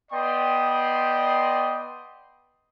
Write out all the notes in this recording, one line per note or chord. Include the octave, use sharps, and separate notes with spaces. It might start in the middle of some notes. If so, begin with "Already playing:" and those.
B3 D5 D#5 G5 C6